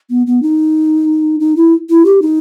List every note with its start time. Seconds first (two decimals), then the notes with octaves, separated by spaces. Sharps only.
0.10 B3
0.27 B3
0.42 D#4
1.40 D#4
1.56 E4
1.90 E4
2.05 G4
2.22 D#4